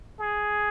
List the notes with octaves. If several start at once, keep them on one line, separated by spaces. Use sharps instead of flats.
G#4